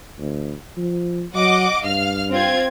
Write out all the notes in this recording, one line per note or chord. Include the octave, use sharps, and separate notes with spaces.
D2
F3
F#3 D#5 F#5 D6
G2 F5 F6
C4 F4 G#6